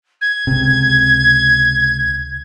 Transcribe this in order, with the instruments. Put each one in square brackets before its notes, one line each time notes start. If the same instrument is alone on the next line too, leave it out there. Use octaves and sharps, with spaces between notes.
[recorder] G#6
[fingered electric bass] C#2 C3